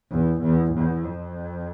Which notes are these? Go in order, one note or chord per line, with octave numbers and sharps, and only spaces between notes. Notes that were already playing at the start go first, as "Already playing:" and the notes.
E2
E2
E2
F2